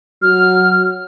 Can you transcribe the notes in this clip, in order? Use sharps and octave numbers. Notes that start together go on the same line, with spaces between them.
F#3 F6